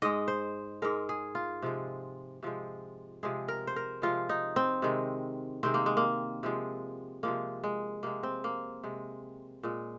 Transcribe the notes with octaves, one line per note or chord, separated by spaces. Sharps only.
G#2 G#3 D#5
C5
G#2 G#3 A#4
G#4
F4
C3 F3 G#3
C3 F3 G#3
C3 F3 G#3 G#4
A#4
C5
A#4
C3 F3 G#3 F4
D#4
C4
C3 D#3 G#3
C3 D#3 G#3 C4
A#3
G#3
A#3
C3 F3 G#3
C3 F3 G#3 A#3
G#3
C3 G#3 A#3
C4
A#3
C3 G#3
A#2 G#3